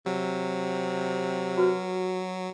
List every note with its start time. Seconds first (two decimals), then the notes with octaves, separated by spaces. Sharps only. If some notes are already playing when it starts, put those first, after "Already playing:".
0.06 C3 F#3
1.58 F#4 B4